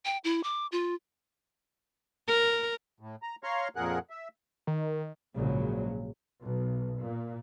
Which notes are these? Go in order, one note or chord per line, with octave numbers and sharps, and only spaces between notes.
G5
E4
D6
F4
A#4
A2
A#5
C#5 F5 A#5 C6 C#6 F6
F2 A#2 G#4 A#4 F#5 F#6
E5
D#3
A#1 G#2 C#3 F#3
B1
A#2